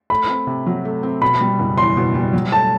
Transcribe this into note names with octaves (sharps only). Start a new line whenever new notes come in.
A3 B5
C4
C3
F#3
A3
C4
B2 B5
G3
F#1
E2 C6
B2
G3
F#3
A3 A5